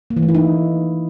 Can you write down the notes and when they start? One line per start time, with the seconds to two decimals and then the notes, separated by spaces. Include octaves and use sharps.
0.10 A#3
0.17 E3
0.23 A3
0.29 E4
0.35 D#4